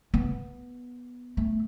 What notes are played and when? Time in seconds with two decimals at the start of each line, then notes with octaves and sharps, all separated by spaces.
0.14 B3
1.37 A3